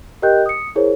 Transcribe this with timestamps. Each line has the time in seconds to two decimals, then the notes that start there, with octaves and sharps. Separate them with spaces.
0.22 G4 A#4 D#5 G5 F#6 G6
0.46 D#6 C#7
0.76 E4 G#4 A#4 C5 C#5